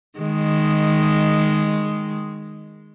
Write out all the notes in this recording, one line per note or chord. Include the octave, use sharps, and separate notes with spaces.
D#3 G#3